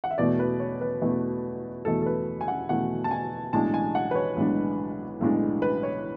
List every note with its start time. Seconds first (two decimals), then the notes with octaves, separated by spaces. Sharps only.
0.04 F#5
0.11 E5
0.18 E2 B2 A3 D5
0.39 B4
0.60 C#5
0.81 B4
1.02 E2 B2 A3
1.85 E2 B2 A3 A4
2.02 A4
2.06 B4
2.41 G#5
2.48 F#5
2.69 E2 B2 A3 F#5
3.04 A5
3.11 G#5
3.53 B1 A2 G#3 D4 A5
3.74 G#5
3.95 F#5
4.11 B4
4.15 C#5
4.36 B1 A2 G#3 D4
5.21 B1 A2 G#3 D4
5.62 B4
5.83 C#5